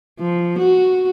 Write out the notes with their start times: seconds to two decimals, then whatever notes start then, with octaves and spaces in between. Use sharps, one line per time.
0.19 F3
0.59 F#4